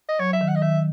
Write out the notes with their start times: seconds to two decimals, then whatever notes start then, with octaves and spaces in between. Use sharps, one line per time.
0.09 D#5
0.19 F#3 C#5
0.33 E5
0.41 D#3
0.48 F#5
0.56 D#5
0.62 D#3 E5